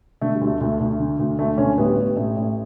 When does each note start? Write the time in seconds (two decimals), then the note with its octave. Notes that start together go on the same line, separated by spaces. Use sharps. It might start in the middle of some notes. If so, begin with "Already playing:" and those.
0.21 D3 A3
0.35 G3
0.41 D2
0.47 A3
0.61 D2 A3
0.80 D2
1.00 D3
1.19 D2
1.38 D2 A3
1.58 D3 A3 C#4
1.78 A1 G3 B3
1.97 A1
2.16 A1 A3
2.36 A1